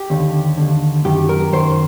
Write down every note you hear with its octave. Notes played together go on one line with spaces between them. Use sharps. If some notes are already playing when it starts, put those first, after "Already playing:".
Already playing: G4
D#2 D3
D#2 D3
F#2 D#3 G4
A#4
F#2 D#3 C5